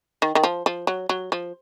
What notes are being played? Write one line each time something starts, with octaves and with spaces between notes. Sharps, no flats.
D#3
D#3
F3
F3
F#3
F#3
F3